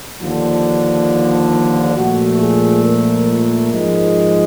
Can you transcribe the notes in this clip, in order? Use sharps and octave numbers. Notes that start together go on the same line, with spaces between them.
D#2 D3 F3
A#2 F3 A3 F#4
G#4
A#4
G#2 F3 G#3